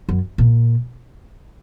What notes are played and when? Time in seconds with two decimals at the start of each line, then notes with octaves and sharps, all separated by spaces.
0.09 F#2
0.38 A#2